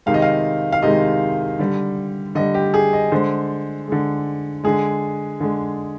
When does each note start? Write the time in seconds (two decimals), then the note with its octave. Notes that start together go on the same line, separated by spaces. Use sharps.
0.06 C3 D#3 G#3 F5
0.14 D#5
0.22 F5
0.72 F5
0.83 C3 D#3 G#3 D#5
1.59 D3 G3
2.35 D3 D#5
2.39 G3
2.54 G4
2.74 G#4
2.93 D#5
3.12 D3 G#3 C5
3.88 D3 G#3
4.64 D3 G#3 G#4
5.40 D3 G#3